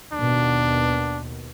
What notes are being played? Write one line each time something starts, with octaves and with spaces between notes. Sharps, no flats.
D#2 B2 D4